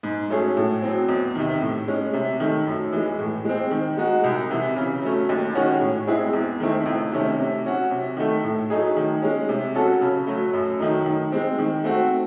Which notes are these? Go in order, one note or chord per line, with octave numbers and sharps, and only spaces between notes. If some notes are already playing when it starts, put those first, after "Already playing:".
G#2
F#3 A3 C#4 G#4
A2
F#3 C4
E2
C3 D#3
A2
G#3 C#4
C3
D#3 A3
F#2
E3 G#3
A2
G#3 C4
D#3
G#3 D#4 F#4
C2
C3 E3
C#3
F#3 A3 C#4
D#2
D#3 G#3 C#4 F#4
A2
G#3 C4 E4 G#4
E2
D#3 A3 C4 E4
C#2
C3 D#3 A3 C#4
C3
F#3 C#4 F#4
C3
D#3 A3
A2
F#3 A3 D#4 G#4
D#3
G#3 C#4
C3
F#3 C#4 F#4 A4
C#3
F#3 A3
F#2
D#3 F#3 A3 D#4
D#3
G#3 C4
D#3
A3 C4 F#4